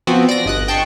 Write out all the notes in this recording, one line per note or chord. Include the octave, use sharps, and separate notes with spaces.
F3 B3 C4 F#4
D5 A#6
G1 D#5 F#6
G5 A5 C6 C#6